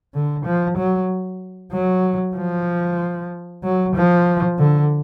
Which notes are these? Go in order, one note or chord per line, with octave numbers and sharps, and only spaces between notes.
D3
F3
F#3
F#3
F3
F#3
F3
D3